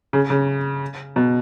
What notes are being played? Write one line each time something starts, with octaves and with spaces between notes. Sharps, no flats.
C#3
C#3
B2